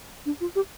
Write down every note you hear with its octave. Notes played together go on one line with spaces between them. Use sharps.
D4
F4
G4